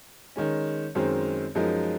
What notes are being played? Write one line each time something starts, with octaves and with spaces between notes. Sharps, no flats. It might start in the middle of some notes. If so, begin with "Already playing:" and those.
D#3 G#3 C#4
F#2 D#3 G#3 C4
F#2 F3 G#3 D#4 A#4